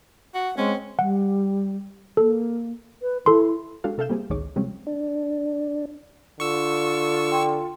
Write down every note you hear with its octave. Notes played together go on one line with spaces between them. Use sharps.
F#4 F#5
G#3 C4 C#4
G3 F#5
A#3 A4
B4
E4 A4 C6
G#3 D4 F#4 G4 A4 F5
C3 A4 E5 F5 G6 E7
G3 A#3 C4 G4 G#4
A1 D2 D#3 G#4 C#5 D6
C3 F3 G3 G#3 C4 C#4
D4
D3 F4 C#6 E6
D4 G5 C6